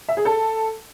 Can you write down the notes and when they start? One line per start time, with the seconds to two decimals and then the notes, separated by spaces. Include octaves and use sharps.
0.09 E5
0.17 G#4
0.25 A4